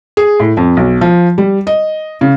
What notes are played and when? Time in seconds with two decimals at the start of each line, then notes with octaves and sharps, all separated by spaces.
0.17 G#4
0.40 A2
0.57 F2
0.77 B1
1.01 F3
1.38 G3
1.67 D#5
2.21 C#3